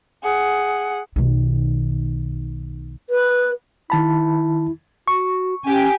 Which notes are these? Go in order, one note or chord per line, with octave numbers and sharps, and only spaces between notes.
G#4 F#5
B1 D#3
B4
D#3 E4 A5 B5
F#4 C#6
C#4 G4 G#5